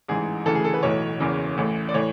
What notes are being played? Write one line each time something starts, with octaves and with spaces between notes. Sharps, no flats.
A1 G#2 E3 G#4
D2 C#3 E3 A4
G#4
A4
B4
B1 A2 E3 C#5
F#1 E2 C#3 E3
A1 A2 E3
D5
A2 E3 C#5